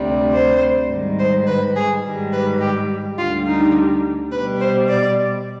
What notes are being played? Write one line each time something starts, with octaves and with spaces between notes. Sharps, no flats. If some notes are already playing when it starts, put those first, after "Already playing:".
Already playing: D2 C3 G3
C5
G#2 D#3 G3
C5
B4
G#4
G#2 D#3 G3
B4
G4
D2 D3 G3 F4
D#4
B2 G3 B4
C5
D5